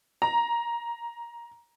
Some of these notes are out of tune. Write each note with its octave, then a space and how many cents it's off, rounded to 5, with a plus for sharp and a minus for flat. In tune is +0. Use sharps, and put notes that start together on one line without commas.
A#5 +15